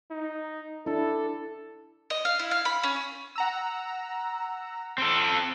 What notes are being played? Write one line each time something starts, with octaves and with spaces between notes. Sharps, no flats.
D#4
D4 E4 A4
D#5
F5
E4
F5
B5
C#4
F#5 A#5 E6
C4 A4